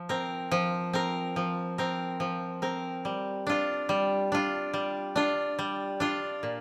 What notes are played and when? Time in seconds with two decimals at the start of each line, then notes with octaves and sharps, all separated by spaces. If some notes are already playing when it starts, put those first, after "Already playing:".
Already playing: F3
0.09 C4 A#4
0.51 F3
0.93 C4 A#4
1.36 F3
1.78 C4 A#4
2.20 F3
2.62 C4 A#4
3.05 G3
3.47 D4 F4
3.89 G3
4.32 D4 F4
4.74 G3
5.16 D4 F4
5.59 G3
6.00 D4 F4
6.43 A#2